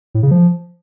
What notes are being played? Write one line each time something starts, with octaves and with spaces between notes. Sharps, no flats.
A2
C#3
F3